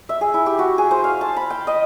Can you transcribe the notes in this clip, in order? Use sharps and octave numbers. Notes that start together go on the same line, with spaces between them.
E5
G#4
E4
G4
F#4
G#4
C5
F5
A5
B5
G5
D#5